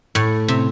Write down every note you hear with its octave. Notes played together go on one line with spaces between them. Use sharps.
A2
C3